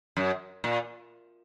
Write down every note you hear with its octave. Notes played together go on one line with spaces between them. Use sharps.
F#2
A#2